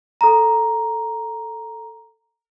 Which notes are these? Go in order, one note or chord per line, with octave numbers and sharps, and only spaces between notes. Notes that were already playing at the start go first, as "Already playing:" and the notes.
A4 A#5